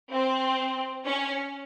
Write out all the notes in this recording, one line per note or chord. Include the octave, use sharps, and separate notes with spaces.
C4
C#4